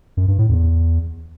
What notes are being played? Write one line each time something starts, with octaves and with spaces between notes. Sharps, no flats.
F#2
G2
A2
E2